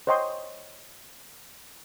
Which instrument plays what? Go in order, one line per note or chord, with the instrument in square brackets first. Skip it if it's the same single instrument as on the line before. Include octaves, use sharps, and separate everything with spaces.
[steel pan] C5 C#5 D#5 G5 C6